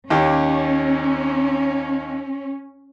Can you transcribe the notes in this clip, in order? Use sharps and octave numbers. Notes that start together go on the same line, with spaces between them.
D#2 C#4 G4